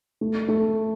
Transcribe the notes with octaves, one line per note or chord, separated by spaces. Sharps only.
A3
A3